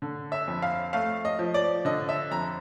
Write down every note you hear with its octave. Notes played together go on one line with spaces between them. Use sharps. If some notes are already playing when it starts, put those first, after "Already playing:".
D3
E5
F2
F5
A3 F5
D#5
F3
D5
D3 D#5
E5
F2 A#5